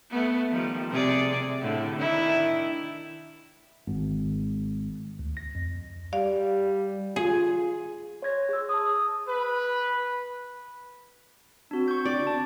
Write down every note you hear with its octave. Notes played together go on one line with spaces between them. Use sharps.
A3 B3
D#3 F3 G3
C3 G#4 D5
A2 D3
D#3 D4 E4
G#1
D2
A#6
F2
G3 D5 F5
F4 G#4
C#5 C6 G#6 A#6
G#4 E6
A5 D#6
B4
C4 D4 F#4
C#6 G6
D5
A5